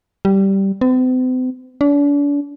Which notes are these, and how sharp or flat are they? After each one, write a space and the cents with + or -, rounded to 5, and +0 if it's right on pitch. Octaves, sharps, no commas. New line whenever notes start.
G3 -10
C4 -45
D4 -40